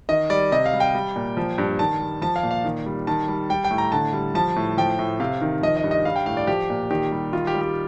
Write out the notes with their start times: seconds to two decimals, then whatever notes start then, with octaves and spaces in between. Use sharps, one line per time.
0.09 D#3 D#5
0.30 G3 D5
0.52 C3 D#5
0.66 F5
0.73 G3
0.80 G5
0.95 G3
1.16 A#2
1.37 F3
1.58 G2
1.79 D#3 A5
2.01 G3
2.22 F3 A5
2.36 F5
2.43 A#2
2.51 F5
2.65 D#3
2.86 G3
3.07 D#3 A5
3.28 G3
3.50 G3 G5
3.64 G5
3.71 A2
3.78 A#5
3.92 D3 A5
4.13 G3
4.35 F3 A5
4.56 A2
4.77 F3 G5
4.99 A2
5.20 C3 F5
5.42 D#3
5.62 F3 D#5
5.77 D#5
5.84 G2
5.91 D#5
6.05 G3 F5
6.16 G5
6.26 A2 F5
6.37 D5
6.47 F3 G4
6.70 A#2
6.90 D#3 G4
7.12 G3
7.33 D#3 F4
7.47 G4
7.55 G3
7.61 G4